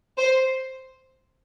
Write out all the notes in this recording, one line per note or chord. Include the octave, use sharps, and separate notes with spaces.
C5